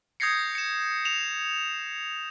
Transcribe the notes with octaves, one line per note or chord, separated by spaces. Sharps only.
D#6 G6 G#6 A#6 C7 C#7
C#7 E7
E7 F7